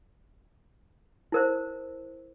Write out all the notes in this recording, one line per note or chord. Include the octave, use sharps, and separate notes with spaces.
E4 A#4 C5